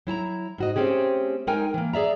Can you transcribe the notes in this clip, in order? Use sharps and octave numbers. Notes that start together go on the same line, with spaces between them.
F#3 E4 A5 A#5
G#2 F#4 D#5
A3 C4 C#4 G4 G#4
G#3 D#4 A#4 G5 G#5
E3 A#3
G#4 D5 E5 A#5